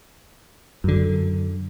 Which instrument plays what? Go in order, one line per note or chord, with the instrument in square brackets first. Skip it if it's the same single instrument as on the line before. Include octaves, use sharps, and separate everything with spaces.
[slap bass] F#2 D3